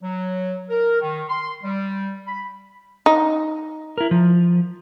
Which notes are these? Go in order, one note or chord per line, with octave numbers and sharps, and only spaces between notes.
F#3
A#4
D#3
C6
G3
B5
D#4
E4 A#4
F3